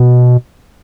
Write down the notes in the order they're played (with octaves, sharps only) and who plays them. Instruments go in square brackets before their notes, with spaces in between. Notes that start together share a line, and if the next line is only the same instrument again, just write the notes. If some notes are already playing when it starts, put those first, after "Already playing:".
Already playing: [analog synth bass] B2